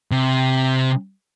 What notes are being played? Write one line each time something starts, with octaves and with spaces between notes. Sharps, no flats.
C3